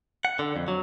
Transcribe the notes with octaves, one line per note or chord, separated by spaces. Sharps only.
F#5
D3
F2
F#3